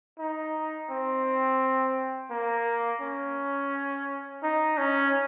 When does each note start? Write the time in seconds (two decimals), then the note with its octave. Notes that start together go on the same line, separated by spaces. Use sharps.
0.19 D#4
0.90 C4
2.31 A#3
3.01 C#4
4.43 D#4
4.78 C#4